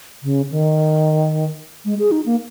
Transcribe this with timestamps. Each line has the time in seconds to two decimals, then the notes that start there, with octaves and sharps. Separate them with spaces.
0.23 C#3
0.51 D#3
1.85 G#3
1.99 G#4
2.11 D#4
2.26 A#3